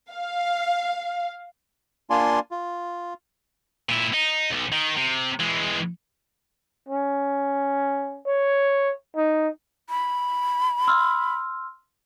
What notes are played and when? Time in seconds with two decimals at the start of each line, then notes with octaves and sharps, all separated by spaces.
0.13 F5
2.10 A#3 D4 F4 D5 G#5 C6
2.51 F4
3.89 A#2 E4
4.14 D#4
4.51 B1
4.72 D#3
4.97 C3
5.40 E3 G#3
6.89 C#4
8.27 C#5
9.16 D#4
9.90 B5
10.87 C6 E6 F6